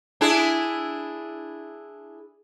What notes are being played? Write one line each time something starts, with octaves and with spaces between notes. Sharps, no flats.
D4 E4 G#4